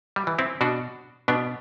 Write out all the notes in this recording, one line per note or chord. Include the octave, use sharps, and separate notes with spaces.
G3
E3
C4 E4
B2 D4 F#4
B2 B3 D4